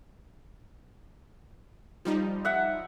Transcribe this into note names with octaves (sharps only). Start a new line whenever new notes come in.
F3 G3 D#4
E5 F#5